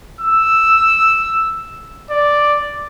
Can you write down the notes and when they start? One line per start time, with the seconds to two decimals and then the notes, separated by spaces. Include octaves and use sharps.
0.21 E6
2.11 D5